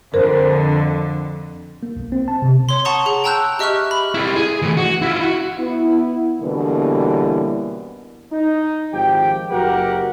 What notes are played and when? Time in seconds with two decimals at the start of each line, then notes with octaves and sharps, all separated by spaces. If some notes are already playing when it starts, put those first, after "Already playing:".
0.14 F2 D3 A#4 C5
1.83 A#3
1.96 B1
2.12 C4
2.28 A5
2.42 C3
2.69 C#5 C6
2.85 F#5 A5 A#5 C#6 D#6
3.06 G#4
3.24 G5 A5 A#5 E6 F#6 G6
3.59 G4 D#5 E5 C#6 F6 F#6
3.91 B5
4.14 E4 G4
4.36 G#4
4.62 E3 A3
4.77 F#4
5.02 E4 F4
5.22 F#4
5.57 B3 E4
6.40 B2 D3 E3 G3 A#3 C#4
8.31 D#4
8.93 G#1 F3 G4 G5
9.50 F#1 F#4 G4 A#4 F#5